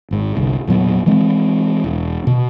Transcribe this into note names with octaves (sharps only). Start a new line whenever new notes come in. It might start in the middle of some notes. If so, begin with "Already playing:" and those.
G#1 G#2
G1 C2
E1 A#2 F#3 B3
E3 G#3 C4
E1
B2